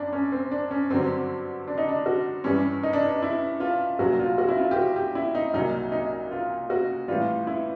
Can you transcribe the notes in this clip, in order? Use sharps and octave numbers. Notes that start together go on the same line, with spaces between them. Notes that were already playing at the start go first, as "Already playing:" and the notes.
Already playing: F#2 C#4 D4
C#4
C4
D4
C#4
G2 D3 F#3 C4
D4
D#4
D4
F#4
G2 E3 G3 C#4
D#4
D4
D#4
E4
F4
C2 A#2 F#3 F#4
F4
F#4
E4
F4
G4
F#4
G4
E4
D#4
C2 A#2 F#3 D#4
D#4
F4
F#4
A2 E3 G3 F4
E4